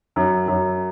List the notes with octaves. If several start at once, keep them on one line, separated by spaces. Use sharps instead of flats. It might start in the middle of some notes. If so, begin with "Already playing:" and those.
F#2
F#2